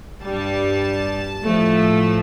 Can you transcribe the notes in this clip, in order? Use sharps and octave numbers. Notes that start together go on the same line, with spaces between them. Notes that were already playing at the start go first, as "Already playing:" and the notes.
G2 G3 A5
A2 F3 A3